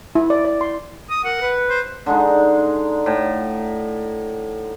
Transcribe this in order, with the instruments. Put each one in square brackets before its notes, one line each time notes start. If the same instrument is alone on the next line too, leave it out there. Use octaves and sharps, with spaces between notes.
[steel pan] E4
D5
D5
C6
[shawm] D#6
[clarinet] A#4 [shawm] F#5
[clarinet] B4
[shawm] C5
[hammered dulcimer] D3 G#3 D#4
A2